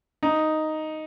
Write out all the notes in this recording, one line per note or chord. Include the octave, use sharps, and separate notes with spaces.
D#4